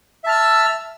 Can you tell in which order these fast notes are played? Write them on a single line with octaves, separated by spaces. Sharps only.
E5 A5 F6 E6